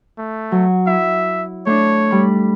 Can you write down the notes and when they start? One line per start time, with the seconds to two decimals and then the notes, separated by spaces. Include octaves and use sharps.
0.18 A3
0.52 F#3
0.87 E4 E5
1.66 A3 D4 C#5
2.11 G3 B5